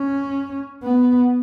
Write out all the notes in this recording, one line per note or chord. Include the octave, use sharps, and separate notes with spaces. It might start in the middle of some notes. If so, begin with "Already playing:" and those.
Already playing: C#4
B3